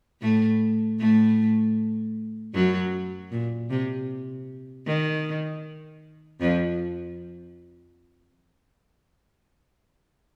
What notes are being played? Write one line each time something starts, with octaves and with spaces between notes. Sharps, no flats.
A2 A3
A2 A3
F#2 F#3
A#2
C3
D#3
F2 F3